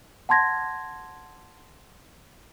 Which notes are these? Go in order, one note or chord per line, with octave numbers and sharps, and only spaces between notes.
F#5 A5 C6 G#6 A#6